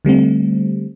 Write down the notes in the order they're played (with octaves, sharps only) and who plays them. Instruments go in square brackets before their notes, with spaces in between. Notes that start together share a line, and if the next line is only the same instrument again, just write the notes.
[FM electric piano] D3 G3 A3 C4